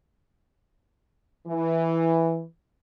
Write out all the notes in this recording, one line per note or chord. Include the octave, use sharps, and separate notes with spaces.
E3